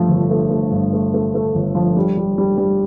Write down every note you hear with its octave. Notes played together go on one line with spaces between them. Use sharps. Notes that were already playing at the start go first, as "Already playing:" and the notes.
Already playing: G2 F3 A3
G1
A3
A3
G2
A3
A3
A3
G1
F3
G3
G3
G3
G3